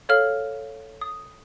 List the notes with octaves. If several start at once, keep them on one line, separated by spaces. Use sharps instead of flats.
A4 C#5 F5 F6
D#6